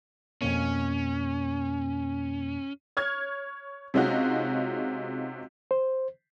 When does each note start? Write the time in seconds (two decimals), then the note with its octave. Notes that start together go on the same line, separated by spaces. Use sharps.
0.41 F2 B2 A#3 C#4
2.97 C#5 F6 G#6
3.94 C3 G#3 C#4 D#4 F4 F#4
5.71 C5